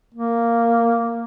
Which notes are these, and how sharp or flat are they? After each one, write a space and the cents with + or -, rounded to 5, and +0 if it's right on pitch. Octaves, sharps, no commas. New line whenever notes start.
A#3 -5